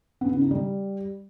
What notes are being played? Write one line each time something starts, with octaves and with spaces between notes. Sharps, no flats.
B3
C#3
D#4
G3